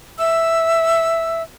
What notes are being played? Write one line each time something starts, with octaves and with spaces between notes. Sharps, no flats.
E5 E6